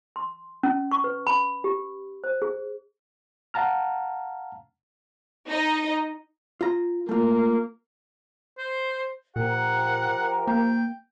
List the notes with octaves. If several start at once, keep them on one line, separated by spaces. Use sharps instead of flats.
C6
C#4
C#6
B4
B5
G4
C5
G#4
F5 F#5 A5 A#5 F6
D#4 D#5
F4 A#5
A3 A#3 F4
C5
A#2 F3 G4 A#4 F#5
A#3 G5